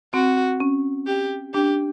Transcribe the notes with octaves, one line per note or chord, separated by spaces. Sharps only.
C4 F#4
C#4
G4
D4 G4